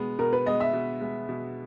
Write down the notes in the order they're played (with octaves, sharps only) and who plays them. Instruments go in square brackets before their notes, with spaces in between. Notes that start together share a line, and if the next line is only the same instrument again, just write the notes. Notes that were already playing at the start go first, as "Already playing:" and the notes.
Already playing: [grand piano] B2 G#3 B3
[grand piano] B2 [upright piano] A#4
[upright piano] B4
[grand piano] G#3 B3 [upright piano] D#5
[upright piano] E5
[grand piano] B2
G#3 B3
B2